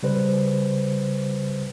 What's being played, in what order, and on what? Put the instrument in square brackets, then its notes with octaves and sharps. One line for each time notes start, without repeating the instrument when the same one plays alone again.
[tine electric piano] C#3 G3 B4 C5